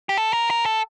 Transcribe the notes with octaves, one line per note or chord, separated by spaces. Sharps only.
G4
A4
A#4
A#4
A4